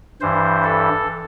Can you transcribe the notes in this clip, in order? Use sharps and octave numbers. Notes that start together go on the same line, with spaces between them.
G2 E3 C5
A4